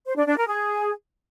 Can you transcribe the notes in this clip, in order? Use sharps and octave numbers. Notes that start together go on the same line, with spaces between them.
C5
D4
D4
A#4
G#4